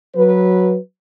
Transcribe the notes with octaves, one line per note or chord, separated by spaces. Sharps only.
F#3 B4